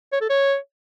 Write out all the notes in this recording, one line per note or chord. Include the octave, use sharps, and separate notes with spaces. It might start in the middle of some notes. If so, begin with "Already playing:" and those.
C#5
A4
C#5